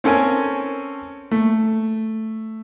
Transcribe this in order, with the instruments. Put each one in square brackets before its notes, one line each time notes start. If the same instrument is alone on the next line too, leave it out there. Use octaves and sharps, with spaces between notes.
[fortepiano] C4 C#4 A4 A#4 G#5
A3